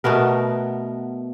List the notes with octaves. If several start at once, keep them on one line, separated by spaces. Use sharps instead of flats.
B2 A3 B3 A#4